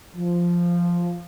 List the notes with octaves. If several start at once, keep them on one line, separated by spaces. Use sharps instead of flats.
F3